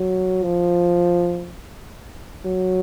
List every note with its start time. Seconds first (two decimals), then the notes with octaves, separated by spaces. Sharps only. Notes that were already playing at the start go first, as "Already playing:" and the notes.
Already playing: F#3
0.44 F3
2.46 F#3